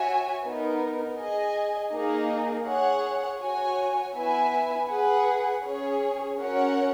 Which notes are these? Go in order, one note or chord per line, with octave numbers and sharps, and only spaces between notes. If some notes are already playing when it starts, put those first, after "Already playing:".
Already playing: F#4 C#5 E5 G#5
B3 D#4 A#4
G#4 D#5 G#5
A#3 D#4 G#4
G#4 C#5 F#5
F#4 C#5 G#5
B3 E4 B4 E5 G#5
G#4 B4 F#5
C#4 G#4 C#5
C#4 F#4 A#4 C#5 F#5